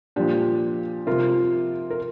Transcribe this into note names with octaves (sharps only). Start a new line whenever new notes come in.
A#2 F3 D4 G4
C3 F3 F4 A#4
A#4